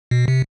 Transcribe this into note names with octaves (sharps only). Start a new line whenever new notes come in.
B2
C3